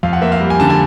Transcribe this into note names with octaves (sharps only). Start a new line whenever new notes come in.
F2 F5
F#5
A#3 E5
F5
G3
G#5
D3 A5
G#5